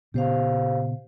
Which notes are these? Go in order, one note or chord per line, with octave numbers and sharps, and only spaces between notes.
A#2 C#3 B3 G4 C5 F5